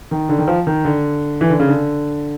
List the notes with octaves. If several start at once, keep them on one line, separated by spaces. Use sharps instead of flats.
D#3
D3
D#3
F3
D#3
D3
E3
D3
C#3
D3